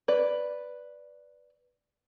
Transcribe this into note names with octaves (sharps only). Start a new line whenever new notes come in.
B4 D5